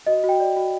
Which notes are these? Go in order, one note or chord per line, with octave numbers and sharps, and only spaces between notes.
F#4 D#5
F#4
G5
D5
F#4